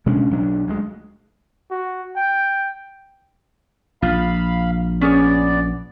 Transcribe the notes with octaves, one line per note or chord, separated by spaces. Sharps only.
B2 G#3 C#4 D4
B1 F#3 D4
D2 G#3
F#4
G5
A#1 F4 F5 B5
B3 C#4 G#4 C#5 D5